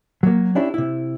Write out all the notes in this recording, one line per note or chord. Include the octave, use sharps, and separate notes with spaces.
F#3 A#3
C#4 D4 E4 G4
C3 E4